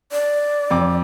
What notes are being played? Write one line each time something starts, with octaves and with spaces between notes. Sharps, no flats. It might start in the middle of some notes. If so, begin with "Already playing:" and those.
D5
F2 D6